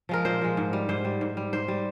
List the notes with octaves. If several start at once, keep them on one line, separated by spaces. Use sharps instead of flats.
F3 G#3 A#4
A#2 C5
F3 G#3
G#2
G3
G#2 C5
G3
G#2
G3
G#2 C5
G3